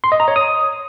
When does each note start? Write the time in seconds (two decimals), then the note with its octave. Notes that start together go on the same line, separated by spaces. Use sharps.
0.04 C6
0.12 D#5
0.20 A#5
0.28 C#5
0.36 D#6